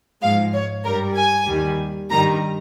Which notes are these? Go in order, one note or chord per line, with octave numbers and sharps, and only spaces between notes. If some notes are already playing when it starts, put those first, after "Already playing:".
G#2 F3 G#3 F5
C#5
G2 G3 A#4
G#5
D#2 D#3 G3
G2 D#3 G3 A#5